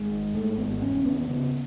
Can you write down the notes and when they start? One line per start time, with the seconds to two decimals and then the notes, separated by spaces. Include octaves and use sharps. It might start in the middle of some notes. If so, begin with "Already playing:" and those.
Already playing: G#1 G#3
0.12 G#2
0.35 G#2 A3
0.58 G#1 B3
0.82 E1 C#4
1.05 D#2 B3
1.28 C#3 B3